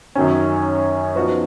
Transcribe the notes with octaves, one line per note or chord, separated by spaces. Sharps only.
F#2 D#3 F#3 C#4
F3 B3 D#4 F#4